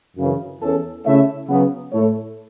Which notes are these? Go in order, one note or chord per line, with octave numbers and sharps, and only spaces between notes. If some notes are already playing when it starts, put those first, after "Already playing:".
F#2 C#3 E3
E2 E3 C#4 A4
C#3 A3 E4 C#5 E5
C#3 F#3 B3
A2 A3 E4 A4 C#5